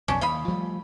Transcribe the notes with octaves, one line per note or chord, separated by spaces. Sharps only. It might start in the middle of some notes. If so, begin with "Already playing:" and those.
B1 F2 C#4 D4
D#2 D#5 F5 B5
F3 G3 A3